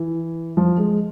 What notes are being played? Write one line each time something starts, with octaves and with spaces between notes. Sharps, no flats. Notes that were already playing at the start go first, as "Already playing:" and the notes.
Already playing: E3
F3
G#3